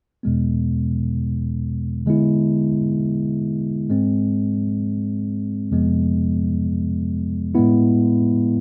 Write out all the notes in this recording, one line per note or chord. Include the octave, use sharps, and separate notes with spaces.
E2 B2 G#3 B3
D3 G#3 B3 E4
G#2 G#3 C4
F2 C3 F3 G#3 B3
A2 G#3 B3 E4